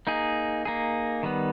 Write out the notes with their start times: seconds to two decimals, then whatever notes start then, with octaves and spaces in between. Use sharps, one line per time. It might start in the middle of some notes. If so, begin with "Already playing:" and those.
0.07 A#3 D#4 G#4
0.65 A#3 D#4 G#4
1.23 D#3 G3 B3